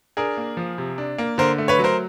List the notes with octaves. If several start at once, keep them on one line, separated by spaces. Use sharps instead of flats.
D4 G#4 A#4
A#3
F3
C3
D4
A#3
D3 A#4 C5
A3
B4 C#5
F#3
A#4 C5